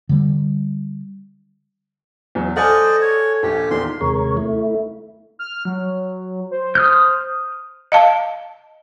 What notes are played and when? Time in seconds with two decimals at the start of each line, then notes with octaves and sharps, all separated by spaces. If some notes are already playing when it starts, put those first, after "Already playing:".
0.09 D3 G3
2.35 E2 F#3
2.57 A4 C5 D5 D#5 F#5 G#5 F6
3.02 C#5
3.43 A#1 D#2 G4
3.71 E2 A#2 D#3 C6
4.01 D#2 C3 G#3 A#4 C#5
4.37 A3 E4
5.39 F6
5.65 F#3
6.51 C5
6.75 D#6 F6 G6
7.92 D#5 F5 A5